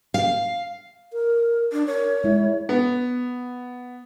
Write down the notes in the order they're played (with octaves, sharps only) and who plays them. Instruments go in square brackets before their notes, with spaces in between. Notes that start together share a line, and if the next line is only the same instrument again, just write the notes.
[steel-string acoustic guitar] F5
[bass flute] A#4
[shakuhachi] D4
[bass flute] A#4 [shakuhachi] C#5
[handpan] G#3 E4 [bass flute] E5
[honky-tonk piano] B3